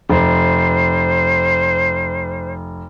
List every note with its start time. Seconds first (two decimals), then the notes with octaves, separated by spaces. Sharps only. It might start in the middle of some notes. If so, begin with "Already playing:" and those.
0.10 F1 C5